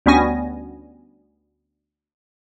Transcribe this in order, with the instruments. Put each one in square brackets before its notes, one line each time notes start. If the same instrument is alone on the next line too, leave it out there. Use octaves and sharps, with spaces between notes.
[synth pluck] D2 G3 B3 C#4 G#5 A#6